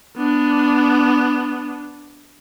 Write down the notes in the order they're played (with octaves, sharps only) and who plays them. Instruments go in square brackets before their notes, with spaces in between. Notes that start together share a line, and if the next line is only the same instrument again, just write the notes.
[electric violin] B3 D4